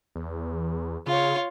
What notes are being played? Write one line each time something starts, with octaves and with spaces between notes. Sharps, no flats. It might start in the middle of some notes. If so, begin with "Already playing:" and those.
E2
C#3 F4 C#5